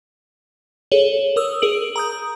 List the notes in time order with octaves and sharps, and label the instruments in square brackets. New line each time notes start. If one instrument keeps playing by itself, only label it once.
[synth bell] G#4 A4 C#5 F#7 G7
A#4 D#6 E6
G#4 A#4 D7 F#7
A#5 D#6 G6